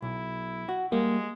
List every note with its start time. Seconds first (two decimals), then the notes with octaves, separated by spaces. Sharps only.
0.02 B1 E4
0.69 F#4
0.92 G3 G#3 A#3